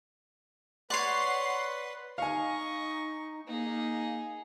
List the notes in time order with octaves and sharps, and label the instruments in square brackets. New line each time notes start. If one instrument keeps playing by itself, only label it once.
[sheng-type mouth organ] B4 [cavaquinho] C#5 D5 [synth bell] F#5 C6 C7
[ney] D#4 [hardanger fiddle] D#5 C#6 [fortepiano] F5 G#5
[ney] A#3 [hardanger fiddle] D#4 G#4